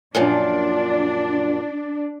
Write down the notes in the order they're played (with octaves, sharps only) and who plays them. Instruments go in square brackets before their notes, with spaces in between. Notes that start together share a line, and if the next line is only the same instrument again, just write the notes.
[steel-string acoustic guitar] F#2 A#2 F3 [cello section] D4